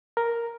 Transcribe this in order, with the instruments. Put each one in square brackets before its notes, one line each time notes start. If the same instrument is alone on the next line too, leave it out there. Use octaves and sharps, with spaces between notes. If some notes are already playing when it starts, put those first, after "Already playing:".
[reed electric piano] A#4